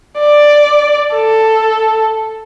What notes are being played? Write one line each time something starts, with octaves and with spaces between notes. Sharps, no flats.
D5
A4